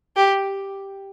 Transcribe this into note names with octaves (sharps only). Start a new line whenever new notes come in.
G4